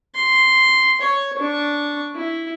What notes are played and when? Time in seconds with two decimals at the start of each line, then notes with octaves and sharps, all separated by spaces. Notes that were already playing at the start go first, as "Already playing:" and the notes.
0.15 C6
1.01 C#5
1.38 D4 C#6
2.15 E4